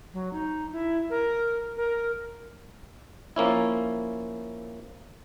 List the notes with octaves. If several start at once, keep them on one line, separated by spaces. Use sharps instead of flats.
F#3
D#4
E4
A#4
A#4
F3 A#3 C#4 E4